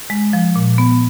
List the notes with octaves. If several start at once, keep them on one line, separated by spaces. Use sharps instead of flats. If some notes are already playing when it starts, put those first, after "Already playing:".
G#3
F3
A#2
B3